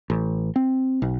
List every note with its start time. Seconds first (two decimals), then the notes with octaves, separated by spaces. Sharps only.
0.10 A1
0.56 C4
1.02 B1